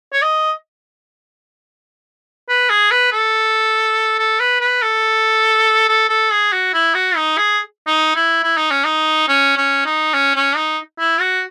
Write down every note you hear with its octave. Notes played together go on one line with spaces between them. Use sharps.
C#5
D#5
B4
G#4
B4
A4
A4
B4
B4
A4
A4
A4
G#4
F#4
E4
F#4
D#4
G#4
D#4
E4
E4
D#4
C#4
D#4
C#4
C#4
D#4
C#4
C#4
D#4
E4
F#4